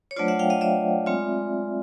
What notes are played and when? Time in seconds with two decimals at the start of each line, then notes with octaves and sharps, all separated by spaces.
0.11 C#5
0.16 F#3 A3 D4 F4 C5 D5
0.28 E5 F#5
0.39 F5 G5
0.50 D#5 F5
0.61 D5 E5
1.06 G#3 C4 F4